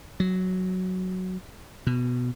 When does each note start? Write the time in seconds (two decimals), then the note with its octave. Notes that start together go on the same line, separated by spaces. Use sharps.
0.20 F#3
1.87 B2